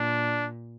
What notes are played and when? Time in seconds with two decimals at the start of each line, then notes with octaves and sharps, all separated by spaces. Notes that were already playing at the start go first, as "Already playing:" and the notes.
Already playing: A#2 D4